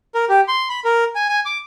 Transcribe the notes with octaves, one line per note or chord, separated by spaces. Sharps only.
A#4
G4
C6
B5
A#4
G#5
G#5
D6